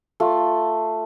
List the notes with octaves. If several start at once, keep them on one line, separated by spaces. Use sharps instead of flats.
A3 F4